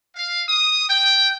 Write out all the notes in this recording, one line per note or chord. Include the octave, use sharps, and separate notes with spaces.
F5
D#6
G5